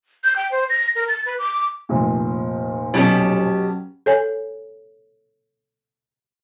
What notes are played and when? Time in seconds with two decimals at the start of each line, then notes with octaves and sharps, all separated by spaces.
0.24 G6
0.36 G5
0.51 C5
0.70 A#6
0.96 A#4
1.08 A6
1.26 B4
1.39 D6
1.89 F1 A#2
2.94 B2 F#3 C#4 G4 A4
4.06 A4 C#5 G#5